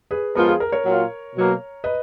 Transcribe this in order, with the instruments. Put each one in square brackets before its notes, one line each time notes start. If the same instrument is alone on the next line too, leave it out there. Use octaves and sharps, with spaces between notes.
[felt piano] G#4 B4
[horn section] F3 G#3 B3 F4 [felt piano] A#4
[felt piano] G#4
A#4
A#4 C#5
[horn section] A#2 F#3 A#3 F4
B2 F#3 A#3
[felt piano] B4 D#5